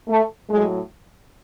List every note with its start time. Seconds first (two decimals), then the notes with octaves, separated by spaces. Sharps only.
0.08 A3
0.49 A2 F#3 G#3